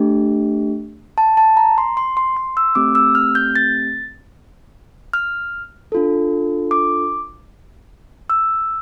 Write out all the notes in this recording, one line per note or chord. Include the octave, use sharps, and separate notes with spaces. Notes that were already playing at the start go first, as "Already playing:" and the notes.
Already playing: A3 D4 G4
A5
A5
A#5
C6
C6
C6
C6
E6
A3 C4 G4 D6
E6
F6
G6
A6
F6
D4 F4 A4
D6
E6